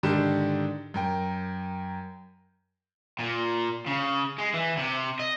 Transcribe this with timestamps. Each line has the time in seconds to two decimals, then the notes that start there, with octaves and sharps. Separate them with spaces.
0.03 G#2 D3 D#3 G4 E7
0.94 F#2 A#4 G5
3.19 A#2
3.86 C#3
4.38 G#3
4.54 E3
4.77 C3
5.19 D#5